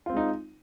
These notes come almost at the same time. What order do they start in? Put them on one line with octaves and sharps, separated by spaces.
F4 C4 G#3 D#4